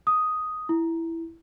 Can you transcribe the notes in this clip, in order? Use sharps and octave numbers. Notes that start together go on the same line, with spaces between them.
D#6
E4